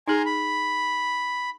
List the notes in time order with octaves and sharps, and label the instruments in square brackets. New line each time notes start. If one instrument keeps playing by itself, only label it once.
[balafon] D#4 G#4 [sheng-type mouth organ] G#5 A#5 C6
[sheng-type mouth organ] B5